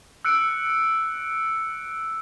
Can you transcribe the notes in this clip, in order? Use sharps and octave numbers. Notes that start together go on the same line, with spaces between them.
E6 F#6 C#7 D7